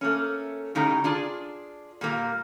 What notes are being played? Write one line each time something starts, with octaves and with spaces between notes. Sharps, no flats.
A3 A#3 C#4
A2 C#3 G3 D#4 A#5
D4 F4 G#4 D5
A#2 G3 A#3 F4